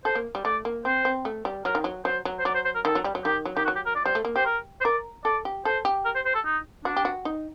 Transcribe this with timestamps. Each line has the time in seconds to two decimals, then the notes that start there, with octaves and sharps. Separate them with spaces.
0.05 A4 C5
0.15 A#3
0.35 G3
0.45 A3 D5
0.65 A#3
0.85 C4 C5
1.05 C4
1.25 A3
1.45 G3
1.65 F#3 A#4
1.75 D#3
1.84 F#3
2.05 F#3 C5
2.25 F#3
2.39 C5
2.45 F#3 D5
2.55 C5
2.65 C5
2.75 A#4
2.85 D#3 A4
2.95 F#3
3.04 G3
3.15 F#3
3.25 D#3 G4
3.45 F#3
3.56 D#3 G4
3.65 F#4
3.68 F#3
3.76 G4
3.86 A#4
3.95 D5
4.05 G3 C5
4.15 A3
4.25 A#3
4.36 G4 C5
4.46 A#4
4.81 C5
4.85 A#4 D5
5.25 A4 D5
5.45 G4
5.65 A4 C5
5.85 G4
6.05 A#4
6.15 C5
6.25 C5
6.35 A4
6.45 D#4
6.85 D4 F#4
6.96 G4
7.05 F#4
7.25 D#4